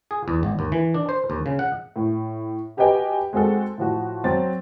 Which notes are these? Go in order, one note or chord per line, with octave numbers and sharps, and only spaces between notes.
G#4
E2
G#1
D#2
E3
D4
C5
D#2
C#3
F#5
A2
F#4 G4 B4 D#5 G5 G#5
G#3 C4 F#4 G#4 A4
A2 F3 F#4
F#3 C4 A6